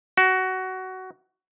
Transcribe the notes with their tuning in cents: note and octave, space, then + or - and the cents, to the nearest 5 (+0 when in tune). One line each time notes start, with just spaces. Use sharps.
F#4 +15